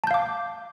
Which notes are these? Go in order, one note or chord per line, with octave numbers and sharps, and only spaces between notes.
F5 A5 D6 G6